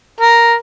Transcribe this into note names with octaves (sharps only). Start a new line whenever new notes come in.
A#4